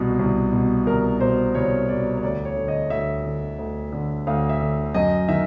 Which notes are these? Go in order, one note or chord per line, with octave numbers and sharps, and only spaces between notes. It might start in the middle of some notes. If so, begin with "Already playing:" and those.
Already playing: C2 B2
C2
B2
C2 A#4
B2 C5
C2 C#5
B2 D5
C#5
D2 D5
C#5
D3
D#5
D2 E5
D3
D2
D3
D2 F5
E5
D3
F#2 D#5
D#3 E5